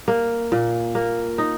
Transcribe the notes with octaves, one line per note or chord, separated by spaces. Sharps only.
A#3
A#2
A#3
D#4